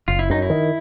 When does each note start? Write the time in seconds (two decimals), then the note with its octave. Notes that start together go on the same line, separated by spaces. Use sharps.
0.08 F#1 F4
0.19 E4
0.30 F#2 D#4
0.42 E4
0.50 D#3